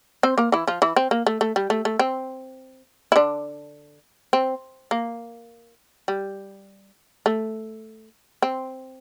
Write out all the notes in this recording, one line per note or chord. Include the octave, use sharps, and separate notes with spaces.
C4 C5
A#3 A#4
E3 E4
F3 F4
E3 E4
C4
A#3
A3
A3
G3
A3
A3
C4
E4
D3 D4
C4
A#3
G3
A3
C4